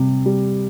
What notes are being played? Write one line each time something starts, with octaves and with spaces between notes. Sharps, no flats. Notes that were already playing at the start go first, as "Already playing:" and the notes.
Already playing: C3 G3
G3